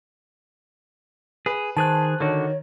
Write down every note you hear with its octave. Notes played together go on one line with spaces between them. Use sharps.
G#4 B4
D#3 G#4 C5 A5 F#6
D3 D#3 F#4 C#5